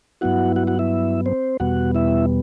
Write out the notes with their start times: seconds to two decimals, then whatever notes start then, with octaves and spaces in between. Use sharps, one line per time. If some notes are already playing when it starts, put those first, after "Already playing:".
0.21 G2 F#3 B3 E4 F#4 F#5
0.56 F#4 F#5
0.67 F#4 F#5
0.79 E4 E5
1.26 C4 C5
1.60 E2 B2 G3 B3 F#4 F#5
1.95 E4 E5